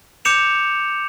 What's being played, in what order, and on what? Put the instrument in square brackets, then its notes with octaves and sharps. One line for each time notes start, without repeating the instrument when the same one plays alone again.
[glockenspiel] D6 G6 C#7 E7 F7